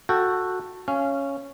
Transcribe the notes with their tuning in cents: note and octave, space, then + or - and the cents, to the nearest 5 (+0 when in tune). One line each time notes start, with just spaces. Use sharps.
F#4 -10 A4 +10 G5 +0
C#4 +0 F5 -25